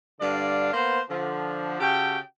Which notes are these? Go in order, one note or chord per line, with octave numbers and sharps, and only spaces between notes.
G2 D3 D4 D5 F5
A#3 B3 C5
D3 F3
C#3 F#4 G4 A4 G5